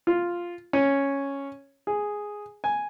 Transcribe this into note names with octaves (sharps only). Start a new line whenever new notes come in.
F4
C#4
G#4
G#5